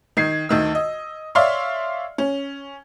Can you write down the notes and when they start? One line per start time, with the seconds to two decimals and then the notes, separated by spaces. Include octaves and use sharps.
0.17 D#3 G#6 C7
0.49 D2 D#3 E6
0.75 D#5
1.35 C#5 D5 E5 F5 C6
2.18 C#4